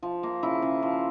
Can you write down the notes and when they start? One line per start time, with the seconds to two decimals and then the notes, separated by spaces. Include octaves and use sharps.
0.03 F3
0.23 A#3
0.43 C#3 E4
0.62 C#3
0.82 F3